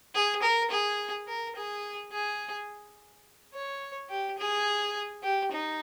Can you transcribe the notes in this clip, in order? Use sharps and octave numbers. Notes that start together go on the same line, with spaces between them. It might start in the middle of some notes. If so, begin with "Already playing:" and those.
G#4
A#4
G#4
A#4
G#4
G#4
C#5
G4
G#4
G4
D#4